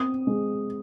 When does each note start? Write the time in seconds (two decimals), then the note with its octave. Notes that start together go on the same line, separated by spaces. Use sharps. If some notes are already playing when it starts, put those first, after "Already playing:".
Already playing: C4 D#6
0.27 G#3